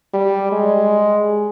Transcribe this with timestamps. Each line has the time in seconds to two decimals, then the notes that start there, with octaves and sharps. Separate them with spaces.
0.14 G3
0.52 G#3